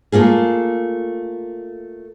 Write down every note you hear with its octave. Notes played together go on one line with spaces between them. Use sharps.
A3 A#3 F4 G#4